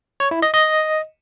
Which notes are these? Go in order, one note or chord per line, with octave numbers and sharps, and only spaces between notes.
C#5
E4
D#5
D#5